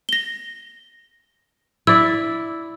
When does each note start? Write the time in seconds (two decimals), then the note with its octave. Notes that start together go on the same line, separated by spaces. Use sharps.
0.09 A#6 G7
1.87 E4 D5 E6